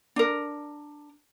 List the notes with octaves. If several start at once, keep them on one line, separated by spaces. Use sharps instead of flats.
D4 A#4